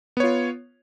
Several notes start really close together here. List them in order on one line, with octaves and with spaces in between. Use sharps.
B3 C#5 F4